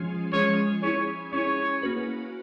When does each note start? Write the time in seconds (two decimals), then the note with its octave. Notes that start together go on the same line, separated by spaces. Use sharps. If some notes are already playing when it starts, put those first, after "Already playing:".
Already playing: F3 G#3 C#4 F4 G#4
0.33 F3 G#3 C#4 F4 G#4 C#5
0.82 C#4 E4 G#4 C#5
1.33 C#4 E4 G#4 C#5
1.82 A#3 C#4 F#4 B4